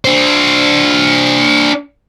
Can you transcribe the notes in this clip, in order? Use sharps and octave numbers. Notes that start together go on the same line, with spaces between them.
D4 C5